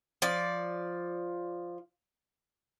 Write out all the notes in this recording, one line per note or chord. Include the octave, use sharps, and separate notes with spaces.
F3 D5